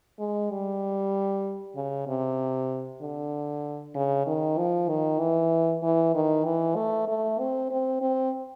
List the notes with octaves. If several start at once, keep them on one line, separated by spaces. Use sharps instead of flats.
G#3
G3
C#3
C3
D3
C#3
D#3
F3
D#3
E3
E3
D#3
E3
A3
A3
C4
C4
C4